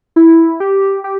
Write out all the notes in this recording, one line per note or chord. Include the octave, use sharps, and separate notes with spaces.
E4
G4
G4